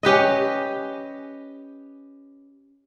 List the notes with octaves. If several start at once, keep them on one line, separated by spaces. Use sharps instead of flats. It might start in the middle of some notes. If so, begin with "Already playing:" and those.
C#4 G4 B4 D#5